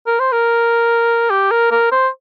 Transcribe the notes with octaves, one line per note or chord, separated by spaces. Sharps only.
A#4
C5
A#4
G4
A#4
A#4
C5